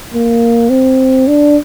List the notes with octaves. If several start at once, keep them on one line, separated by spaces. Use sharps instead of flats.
A#3
C4
D4